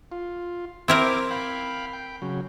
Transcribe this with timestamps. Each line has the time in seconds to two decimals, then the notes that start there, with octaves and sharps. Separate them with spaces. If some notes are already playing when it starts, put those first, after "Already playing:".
0.12 F4
0.88 C4 E4 A#4 D6
1.31 F5 G5 B5
1.93 G5
2.22 C#3 F#3